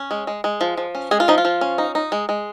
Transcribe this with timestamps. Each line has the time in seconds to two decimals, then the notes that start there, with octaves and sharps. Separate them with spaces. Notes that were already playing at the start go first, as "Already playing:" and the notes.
Already playing: C#4
0.11 G#3
0.27 G#3
0.44 G#3
0.61 F3
0.78 F3
0.95 C#4
1.11 G#3 G#4
1.20 F4
1.28 F3 D#4
1.38 F4
1.45 F3
1.61 C#4
1.78 D#4
1.95 D#4
2.12 G#3
2.29 G#3